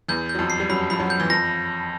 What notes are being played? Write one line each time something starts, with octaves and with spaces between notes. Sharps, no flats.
E2 E3 G6
G6
F#3
F2 F3
C7
G3
F#2 F#3 B5
F3 B5
F#2 F#3
G6
E3
F2 F3 A#6